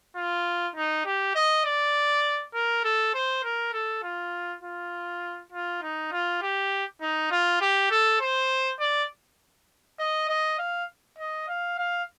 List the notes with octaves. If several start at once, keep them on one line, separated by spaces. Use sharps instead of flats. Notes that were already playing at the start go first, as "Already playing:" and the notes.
F4
D#4
G4
D#5
D5
A#4
A4
C5
A#4
A4
F4
F4
F4
D#4
F4
G4
D#4
F4
G4
A4
C5
D5
D#5
D#5
F5
D#5
F5
F5